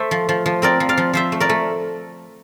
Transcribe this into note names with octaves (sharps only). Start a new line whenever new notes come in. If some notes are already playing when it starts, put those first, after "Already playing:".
Already playing: A3 C5 E5
F3
F3
F3
C4 A#4 D5
F3
D5 F5
F3
F3 C5 E5
A3
A#4 D5
A3